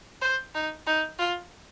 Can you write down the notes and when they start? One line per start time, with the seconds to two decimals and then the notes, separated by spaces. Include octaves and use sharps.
0.22 C5
0.55 D#4
0.87 D#4
1.19 F4